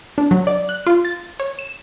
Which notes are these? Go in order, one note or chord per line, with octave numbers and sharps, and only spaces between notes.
D4
F#3
D5
F#6
F4
A6
C#5
E7